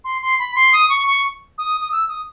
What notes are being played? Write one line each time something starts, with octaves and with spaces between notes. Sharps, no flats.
C6
C6
B5
C6
D#6
C#6
C#6
D#6
D#6
E6
D#6